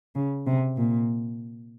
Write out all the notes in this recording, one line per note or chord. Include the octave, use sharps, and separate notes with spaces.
C#3
C3
A#2